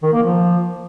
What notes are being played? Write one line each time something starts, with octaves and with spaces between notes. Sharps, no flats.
D#3
A#3
F3